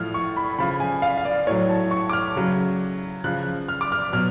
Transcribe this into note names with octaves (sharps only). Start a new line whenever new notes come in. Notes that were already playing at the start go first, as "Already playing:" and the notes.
Already playing: A2 F3 F6
C#6
B5
C#3 F3 B5
G#5
F5
F5
D5
A2 F#3 C#5
A5
C#6
D6
F6
C#3 F#3
C#3 F3 F#6
F6
D6
F6
B2 F#3 F6